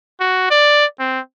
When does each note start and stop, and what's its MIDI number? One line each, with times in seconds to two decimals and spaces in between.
0.20 0.49 66
0.51 0.86 74
1.00 1.20 60